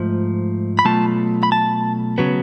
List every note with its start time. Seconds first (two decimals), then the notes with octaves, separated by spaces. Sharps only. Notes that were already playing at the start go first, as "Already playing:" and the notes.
Already playing: G#2 F3 A3
0.79 B5
0.85 B2 F#3 A3 F4 A5
1.43 B5
1.52 A5
2.18 C#3 F#3 B3